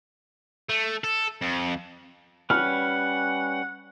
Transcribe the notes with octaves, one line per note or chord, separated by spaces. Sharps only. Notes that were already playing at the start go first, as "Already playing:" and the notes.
A3
A4
F2
G3 C#4 B4 F#5 F6